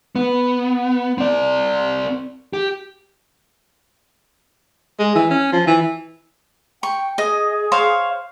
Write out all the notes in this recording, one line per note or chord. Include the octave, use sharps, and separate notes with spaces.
B3
C4 D5
G4
G#3
E3
C#4
F3
E3
G5 C#6
G#4 D#5
C5 C#5 F5